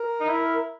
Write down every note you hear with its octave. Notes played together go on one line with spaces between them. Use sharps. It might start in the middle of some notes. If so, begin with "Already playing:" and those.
Already playing: A#4
D#4
E4